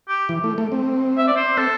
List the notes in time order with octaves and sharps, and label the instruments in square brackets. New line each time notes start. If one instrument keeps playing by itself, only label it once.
[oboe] G4
[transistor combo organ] E3
A3
A3
C4
[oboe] E5
D5
C5
[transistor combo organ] C4 [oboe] A4